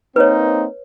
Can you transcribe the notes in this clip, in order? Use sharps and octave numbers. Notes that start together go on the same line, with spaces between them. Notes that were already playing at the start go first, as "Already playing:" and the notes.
A#3 C4 D#4 B4 C#5